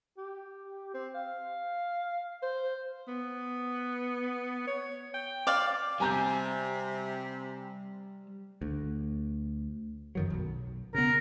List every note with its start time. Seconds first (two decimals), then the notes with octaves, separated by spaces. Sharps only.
0.18 G4
0.94 C4
1.15 F5
2.43 C5
3.08 B3
4.67 C#5
5.14 G5
5.47 D5 F5
6.00 C3 G3 G#5 A#5 G6
8.62 D2
10.15 F#2 D#3 F#3
10.30 D#1 B1
10.95 C#3 B3 A#4